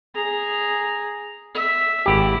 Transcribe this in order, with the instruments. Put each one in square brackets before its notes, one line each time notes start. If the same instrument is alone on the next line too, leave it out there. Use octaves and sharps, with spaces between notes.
[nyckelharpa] G#4 A#5
E5
[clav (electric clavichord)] G#1 G4 [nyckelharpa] E4